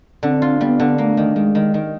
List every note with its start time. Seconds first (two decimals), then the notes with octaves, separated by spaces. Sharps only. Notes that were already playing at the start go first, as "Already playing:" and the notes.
0.23 D3 C4
0.42 F4
0.61 G3 B3
0.80 D3
0.98 A3 A#3
1.17 D#3
1.36 D#3 G#3
1.55 D#3
1.74 D#3